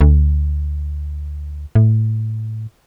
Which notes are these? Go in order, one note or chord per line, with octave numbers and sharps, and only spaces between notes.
D2
A2